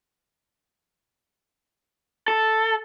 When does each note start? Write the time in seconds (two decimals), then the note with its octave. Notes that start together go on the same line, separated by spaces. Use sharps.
2.28 A4